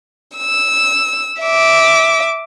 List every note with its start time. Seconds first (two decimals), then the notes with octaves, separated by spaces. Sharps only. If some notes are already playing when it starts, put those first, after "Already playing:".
0.36 E6
1.41 E5 D6